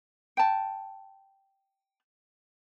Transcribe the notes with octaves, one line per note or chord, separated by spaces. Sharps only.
G5 A5